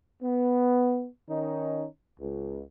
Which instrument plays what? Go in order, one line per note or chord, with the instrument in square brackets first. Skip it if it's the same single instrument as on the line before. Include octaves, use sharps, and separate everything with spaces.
[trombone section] B3
D#3 C#4 D#4
C#2